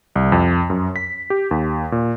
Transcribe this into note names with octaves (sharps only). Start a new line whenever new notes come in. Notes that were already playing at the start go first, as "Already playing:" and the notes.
C2
F2
F#2
B6
G4
D#2
A#2